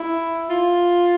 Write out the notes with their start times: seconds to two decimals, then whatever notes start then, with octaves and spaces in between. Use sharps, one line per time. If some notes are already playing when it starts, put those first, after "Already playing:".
Already playing: E4
0.50 F4